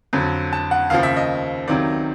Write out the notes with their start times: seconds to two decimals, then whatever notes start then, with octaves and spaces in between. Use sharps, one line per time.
0.13 F2 D3 F#3
0.53 A5
0.71 F#5
0.90 D#2 C#3 F3 F5
1.03 E5
1.17 D#5
1.68 C#2 C3 D#3 F#3 D5